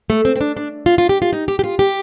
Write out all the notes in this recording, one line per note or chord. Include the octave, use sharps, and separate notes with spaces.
A3
C4
C4
D4
D4
F4
F4
G4
F4
D#4
G4
G4
F4
G4